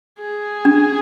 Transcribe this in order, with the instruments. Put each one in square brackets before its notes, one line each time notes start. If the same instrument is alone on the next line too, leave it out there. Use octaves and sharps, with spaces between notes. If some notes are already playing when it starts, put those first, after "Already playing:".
[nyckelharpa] G#4
[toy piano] D4